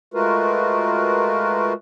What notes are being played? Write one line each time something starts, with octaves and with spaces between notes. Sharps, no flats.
G#3 A3 F4 F#4 A#4 B4